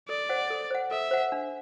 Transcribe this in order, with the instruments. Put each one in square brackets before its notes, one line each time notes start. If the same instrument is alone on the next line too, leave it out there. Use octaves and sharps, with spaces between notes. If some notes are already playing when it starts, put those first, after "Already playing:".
[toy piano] A4 [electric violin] D5
[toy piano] C5 F#5
A4
C5 F#5
[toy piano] A4 [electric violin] E5
[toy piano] C5 F#5
D4